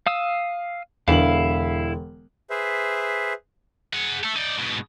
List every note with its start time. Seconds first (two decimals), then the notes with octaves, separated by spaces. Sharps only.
0.07 F5 D#6 E6
1.08 E1 E2 D3 E4 F5 F#7
2.50 G#4 B4 C5 E5
3.93 G#4 F#5
4.24 A3 A4
4.36 D#4 D5
4.57 G#2 B2